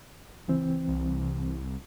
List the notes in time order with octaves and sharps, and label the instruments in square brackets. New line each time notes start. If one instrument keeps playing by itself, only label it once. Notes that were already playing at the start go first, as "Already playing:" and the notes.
[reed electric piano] C#2 E3 C4
[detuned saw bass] C2